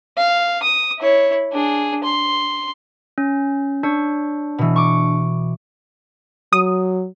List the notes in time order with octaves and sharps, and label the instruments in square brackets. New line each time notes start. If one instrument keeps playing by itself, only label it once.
[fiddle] F5
D#6
E4 C#5
D4 G#4
C6
[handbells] C#4
[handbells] D4 [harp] C#5
[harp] B2 E3
C#6 D6
[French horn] F#3 [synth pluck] D#6